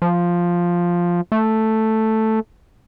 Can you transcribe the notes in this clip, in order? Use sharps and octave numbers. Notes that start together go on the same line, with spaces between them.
F3
A3